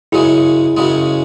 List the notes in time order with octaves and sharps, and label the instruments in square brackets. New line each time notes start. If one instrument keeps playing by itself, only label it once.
[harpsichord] F#2 C#3 G#3 [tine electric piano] E4 G#4
[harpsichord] F#2 C#3 G#3